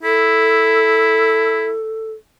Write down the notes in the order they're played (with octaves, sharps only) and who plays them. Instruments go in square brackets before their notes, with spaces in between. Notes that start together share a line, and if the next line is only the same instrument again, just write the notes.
[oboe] E4 [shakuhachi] A4